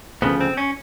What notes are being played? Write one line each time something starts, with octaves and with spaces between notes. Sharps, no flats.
D2 C#3 F3 B3
C4
C#4